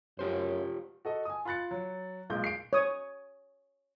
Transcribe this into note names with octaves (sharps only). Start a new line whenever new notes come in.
F#2 F4 G4 C5
F#4 A4 D#5
G#5 D#6
F4 B5 F#6 A6 C#7
F#3
B1 A#2 G#3 G6
C7 D7
C#5 D#6